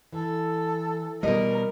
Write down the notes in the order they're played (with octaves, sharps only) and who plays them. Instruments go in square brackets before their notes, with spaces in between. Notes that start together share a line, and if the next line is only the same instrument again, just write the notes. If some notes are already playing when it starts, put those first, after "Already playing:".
[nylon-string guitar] E3 [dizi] A4
[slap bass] B2 G3 [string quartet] A#4 [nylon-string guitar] D#5